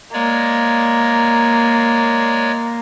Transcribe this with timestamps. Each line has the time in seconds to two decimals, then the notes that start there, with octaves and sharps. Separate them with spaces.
0.13 G#3 A#3 C#5 D5